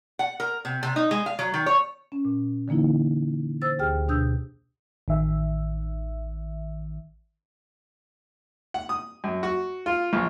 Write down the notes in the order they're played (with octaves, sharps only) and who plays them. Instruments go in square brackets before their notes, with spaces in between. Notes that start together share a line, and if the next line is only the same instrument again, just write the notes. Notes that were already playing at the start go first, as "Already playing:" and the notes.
[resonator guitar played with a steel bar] F#5
A#4
C3
C3
D#4
G#3
F5
F#3
D#3
C#5
[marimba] C#4
A#2
D3 E3 A#3 D#4 E4
C5 E6 A6
D2 G4 G#4 G5 F6
B2 D4 D#6 E6 G6
[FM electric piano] A1 D#3 E5
[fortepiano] F#5
D#6
F#2
F#4
F4
A#1